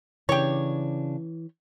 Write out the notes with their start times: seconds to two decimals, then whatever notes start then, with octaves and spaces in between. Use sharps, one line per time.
0.29 C#3 E3 D4 G4 C#5